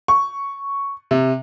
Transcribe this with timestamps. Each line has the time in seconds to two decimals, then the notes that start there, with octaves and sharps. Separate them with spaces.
0.08 C#6
1.11 C3